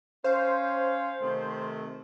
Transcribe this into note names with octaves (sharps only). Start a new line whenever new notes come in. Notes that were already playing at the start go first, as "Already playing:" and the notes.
C#4 C5 F5
C3 D#3 A3